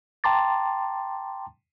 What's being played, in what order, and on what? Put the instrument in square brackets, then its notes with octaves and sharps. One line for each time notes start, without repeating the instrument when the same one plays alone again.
[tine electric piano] G5 A5 A#5 C6 D6 A6